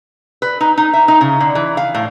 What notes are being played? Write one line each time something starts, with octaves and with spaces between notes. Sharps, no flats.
B4
D#4
D#4
E5
D#4
C#3
D3
E3
F5
A2